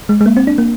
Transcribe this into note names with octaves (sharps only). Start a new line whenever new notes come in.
G#3
G#3
A#3
C4
D4
A#3